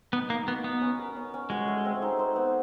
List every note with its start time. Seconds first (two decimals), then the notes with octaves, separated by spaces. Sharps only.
0.13 B3 D#4
0.30 A#3 D#4
0.47 B3 F#4
0.64 B3 D#4
0.82 C#4
0.99 A#4
1.16 C#4
1.34 C#4
1.50 G#3 F#4
1.68 A3
1.85 C4
2.02 D#4
2.19 C5
2.36 B3